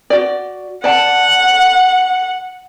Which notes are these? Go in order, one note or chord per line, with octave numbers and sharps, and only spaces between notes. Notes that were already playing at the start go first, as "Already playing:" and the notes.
F#4 D5
D5 F#5 A5